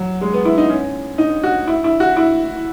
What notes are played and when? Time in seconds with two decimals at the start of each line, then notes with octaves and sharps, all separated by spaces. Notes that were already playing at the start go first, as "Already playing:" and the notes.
Already playing: F#3
0.21 G#3
0.33 B3
0.45 E4
0.58 D#4
0.70 C#4
1.18 D#4
1.43 F#4
1.67 E4
1.84 E4
2.00 F#4
2.17 E4